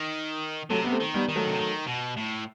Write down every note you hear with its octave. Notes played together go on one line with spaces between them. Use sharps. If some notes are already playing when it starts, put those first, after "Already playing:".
Already playing: D#3
C3 F#3 A3
B3
A3 C4
D#3
G3 B3
D#3
F#3 A3
C3
D#3
B2
A2